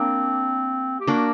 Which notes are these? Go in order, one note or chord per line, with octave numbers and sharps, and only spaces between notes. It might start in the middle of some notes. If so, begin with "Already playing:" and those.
Already playing: A#3 C4 D4
G4
A#3 D4 F#4